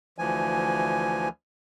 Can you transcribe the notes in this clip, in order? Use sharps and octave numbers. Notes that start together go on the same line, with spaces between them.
D2 E3 F3 G#5